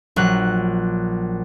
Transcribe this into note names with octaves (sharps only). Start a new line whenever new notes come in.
A#1 F#3 F#6